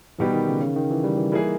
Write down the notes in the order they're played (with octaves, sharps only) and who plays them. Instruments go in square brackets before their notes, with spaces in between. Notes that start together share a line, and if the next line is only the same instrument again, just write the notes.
[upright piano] B2 G3 B3 D#4 G4 [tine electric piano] E3
[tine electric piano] D#3
C#3
C#3
D#3
E3
G3
E3
[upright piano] E3 A#3 D#4 G#4 [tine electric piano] G3